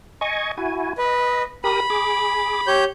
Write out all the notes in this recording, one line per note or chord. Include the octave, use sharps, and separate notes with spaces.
D#5 G#5 C#6
E4 F#4 G#5
B4 D#5
G4 A#4 B5 D#6
G#4 D6
G4 C#5 G6